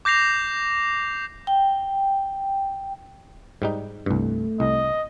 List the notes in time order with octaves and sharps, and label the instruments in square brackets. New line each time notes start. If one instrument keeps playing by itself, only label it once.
[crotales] D6 G6 A#6 C7 F7
[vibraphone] G5
[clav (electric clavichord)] G#2 G3 D#4
[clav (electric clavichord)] C2 G2 [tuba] A3
[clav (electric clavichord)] C2 [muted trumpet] D#5